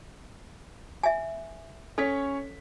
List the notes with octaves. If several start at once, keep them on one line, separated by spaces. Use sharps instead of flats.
E5 G#5
C#4 A4 C#5 B6